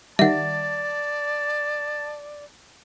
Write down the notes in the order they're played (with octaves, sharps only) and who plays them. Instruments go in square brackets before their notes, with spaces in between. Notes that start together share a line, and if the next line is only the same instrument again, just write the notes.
[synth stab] D#3 G3 [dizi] D5 [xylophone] E5 F#5 [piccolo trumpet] A5